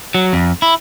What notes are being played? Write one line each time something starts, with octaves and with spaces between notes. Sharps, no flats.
F#3
F2
E4